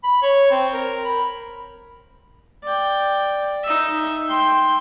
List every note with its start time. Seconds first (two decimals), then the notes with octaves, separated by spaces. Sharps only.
0.04 B5
0.22 C#5
0.51 C4
0.74 A#4
1.05 B5
2.63 D5 G5
3.63 D#4 E5
4.28 G5 C6